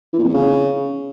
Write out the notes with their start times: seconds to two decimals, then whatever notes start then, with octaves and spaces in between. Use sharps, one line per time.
0.13 E3
0.19 A#2
0.24 F2
0.29 E2
0.34 C#3